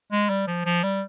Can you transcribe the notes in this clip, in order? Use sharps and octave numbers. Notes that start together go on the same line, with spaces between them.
G#3
G3
F3
F3
G3